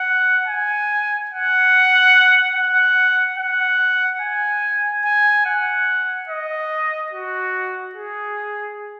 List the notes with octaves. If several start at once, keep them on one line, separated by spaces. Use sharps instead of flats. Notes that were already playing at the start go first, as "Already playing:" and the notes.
Already playing: F#5
G#5
F#5
F#5
F#5
G#5
G#5
F#5
D#5
F#4
G#4